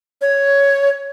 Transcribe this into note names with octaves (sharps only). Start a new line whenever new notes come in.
C#5